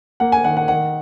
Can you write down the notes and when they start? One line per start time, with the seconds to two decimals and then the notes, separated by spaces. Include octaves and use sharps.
0.20 A#3 F#5
0.32 G#5
0.44 D#3 F#5
0.57 F#5
0.68 D#3 F#5